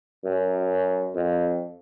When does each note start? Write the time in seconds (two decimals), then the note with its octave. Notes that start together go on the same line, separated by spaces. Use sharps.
0.25 F#2
1.15 F2